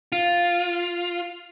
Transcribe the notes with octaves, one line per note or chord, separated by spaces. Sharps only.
F4